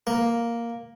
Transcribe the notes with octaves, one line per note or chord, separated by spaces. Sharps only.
A#3